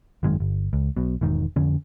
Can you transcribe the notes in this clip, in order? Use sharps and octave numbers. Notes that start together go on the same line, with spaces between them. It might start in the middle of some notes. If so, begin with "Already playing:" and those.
G#1 F#2 D#3 G#3
G1
C#2
B1 B2
E1 G#2 D#3
F2 D3 C#4